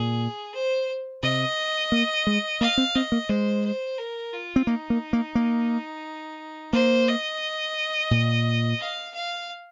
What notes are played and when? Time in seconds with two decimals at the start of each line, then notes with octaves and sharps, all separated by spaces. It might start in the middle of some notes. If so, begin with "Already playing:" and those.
Already playing: A#2 G#4
0.55 C5
1.23 C3 D#5
1.92 A#3
2.27 G#3
2.61 A#3 F5
2.78 C4
2.95 C4 D#5
3.12 A#3
3.29 G#3 C5
3.65 C5
3.98 A#4
4.33 F4
4.56 C4
4.67 A#3 D#4
4.90 A#3
5.13 A#3
5.35 A#3
6.73 A#3 C5
7.08 D#5
8.11 A#2
8.79 F5
9.14 F5